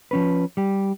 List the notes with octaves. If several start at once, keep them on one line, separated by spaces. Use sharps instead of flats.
F3 C#4 B4
G3 G4